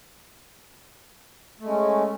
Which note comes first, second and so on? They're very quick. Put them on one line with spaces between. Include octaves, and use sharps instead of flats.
A3 G#3 C#4